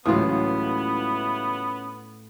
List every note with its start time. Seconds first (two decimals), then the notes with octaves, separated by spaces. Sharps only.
0.06 C#2 A2 E3 F#3 B3 C#4 F4 D#6